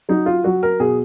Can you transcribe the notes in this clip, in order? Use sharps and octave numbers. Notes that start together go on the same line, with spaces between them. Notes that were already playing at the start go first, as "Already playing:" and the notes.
F#3 D#4
F4
F#3 F#4
A#4
B2 G#4